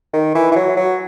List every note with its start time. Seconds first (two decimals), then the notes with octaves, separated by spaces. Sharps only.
0.13 D#3
0.35 E3
0.52 E3
0.56 F#3
0.77 F#3